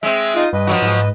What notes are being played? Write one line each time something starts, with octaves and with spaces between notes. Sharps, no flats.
G#3 C4 E5
D#4 F4 D#6
G2 B4 D#5
F3 F#3 F#4
G#2